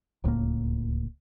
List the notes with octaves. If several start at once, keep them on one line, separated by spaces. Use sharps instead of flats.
D1 C#2 A2 A#3